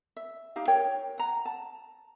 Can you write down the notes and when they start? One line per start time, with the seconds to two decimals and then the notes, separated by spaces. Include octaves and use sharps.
0.16 E5
0.56 D#4 G4 F5
0.68 A#4 C#5 G5
1.18 F#5 A#5
1.45 A5